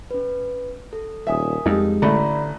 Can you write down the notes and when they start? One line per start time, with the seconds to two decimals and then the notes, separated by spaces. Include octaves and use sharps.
0.11 C#4 B4
0.93 A4
1.27 D#1 A#4 E5 G#5 D#6
1.66 F2 G3 G#3 D#4
2.02 A1 A2 D3 A3 D5 A#5 B5